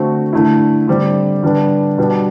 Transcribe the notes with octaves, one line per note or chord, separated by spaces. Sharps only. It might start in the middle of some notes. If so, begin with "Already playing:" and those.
Already playing: D3 A3 C4 F#4
D3 A3 E4
D3 G3 C4
D3 G3 B3 D4
B2 G3 B3 D4